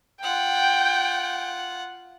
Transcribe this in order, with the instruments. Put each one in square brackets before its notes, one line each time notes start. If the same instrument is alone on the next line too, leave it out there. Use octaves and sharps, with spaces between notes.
[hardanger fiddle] F4 F#5 [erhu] G5